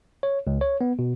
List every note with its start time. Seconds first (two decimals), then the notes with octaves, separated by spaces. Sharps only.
0.23 C#5
0.47 C#2
0.61 C#5
0.81 B3
0.99 B2